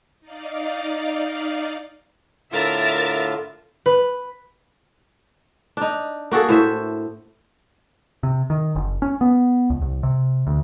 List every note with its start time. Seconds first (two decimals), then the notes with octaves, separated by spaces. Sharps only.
0.21 D#4 D5 F5
2.52 A2 D3 F4 A#4 E5 A6
3.86 B4
5.77 D4 D#4
6.31 A#3 F#4 G#4 A4
6.49 A2 C5 E5
8.23 C3
8.50 D#3
8.75 F#1
9.02 C#4
9.21 B3
9.70 C#2
9.82 C2
10.03 C3
10.47 D2